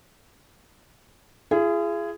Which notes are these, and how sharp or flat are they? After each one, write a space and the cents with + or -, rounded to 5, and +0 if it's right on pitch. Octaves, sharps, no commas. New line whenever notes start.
F4 -45 G#4 +0